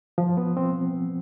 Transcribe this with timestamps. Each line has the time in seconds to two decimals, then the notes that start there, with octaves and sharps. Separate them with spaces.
0.18 F3
0.37 B3
0.57 C4